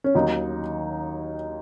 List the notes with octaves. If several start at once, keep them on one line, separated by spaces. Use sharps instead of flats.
C#4
D#2 D#3 F#3 D#4